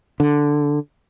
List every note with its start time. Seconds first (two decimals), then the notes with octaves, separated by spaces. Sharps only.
0.20 D3